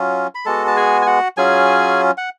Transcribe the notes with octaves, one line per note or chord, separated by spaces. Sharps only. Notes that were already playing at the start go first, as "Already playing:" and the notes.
Already playing: F#3 C#4 F4
B5
G#3 B3 F#4 A4 A5
A5
G#4 G#5
G#5
F#4 F#5
F#3 C#4 F4 G#4 G#5
F#5